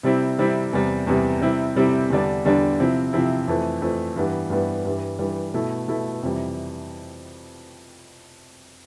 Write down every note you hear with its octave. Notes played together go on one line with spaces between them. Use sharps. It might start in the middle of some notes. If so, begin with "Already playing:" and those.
C3 G3 C4 E4
C3 G3 C4 E4
E2 C3 G3
E2 C3 G3
C3 G3 C4 E4
C3 G3 C4 E4
E2 D3 G3 D4
E2 D3 G3 D4
C3 F3 C4 E4
C3 F3 C4 E4
F2 E3 A3
F2 E3 A3
G2 E3 G3 B3
G2 E3 G3 B3
G2 E3 G3
G2 E3 G3
B2 A3 E4
B2 A3 E4
F2 C3 E3 G3